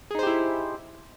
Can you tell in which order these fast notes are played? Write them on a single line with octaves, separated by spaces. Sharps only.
G#4 D#4 C5 G4 E4